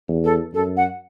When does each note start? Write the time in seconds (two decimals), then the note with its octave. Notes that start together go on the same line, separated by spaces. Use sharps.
0.08 E2
0.23 A4
0.53 F#2 A4
0.76 F#5